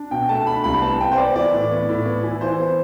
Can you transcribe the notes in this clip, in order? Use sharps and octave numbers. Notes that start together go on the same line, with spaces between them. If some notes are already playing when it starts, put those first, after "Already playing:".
Already playing: D4
B2 G5
A3 A5
D4 B5
C2 B5
B3 A5
B3 G5
C5
B3 D5
E3 D5
A2
B3
A2
B3
E3
E3 C5
B3